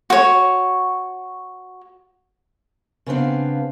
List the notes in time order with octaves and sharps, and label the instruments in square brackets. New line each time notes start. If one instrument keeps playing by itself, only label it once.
[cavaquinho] F#4 C#5
[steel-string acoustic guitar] C#3 B3 C4 D4 F5